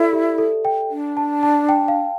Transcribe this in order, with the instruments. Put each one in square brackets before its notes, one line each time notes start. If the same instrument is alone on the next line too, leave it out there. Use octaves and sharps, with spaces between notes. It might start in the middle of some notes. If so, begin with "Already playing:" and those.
Already playing: [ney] E4 [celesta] A4 D5 E5
[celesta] G4
A4
G5
[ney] D4
[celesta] A5
A5
G5
F5